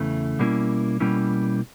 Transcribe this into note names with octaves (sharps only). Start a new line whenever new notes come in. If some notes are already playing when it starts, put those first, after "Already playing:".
Already playing: E2 C#3 E3 A3
B2 G3 A#3 C#4 E4
B2 G3 A#3 C#4 E4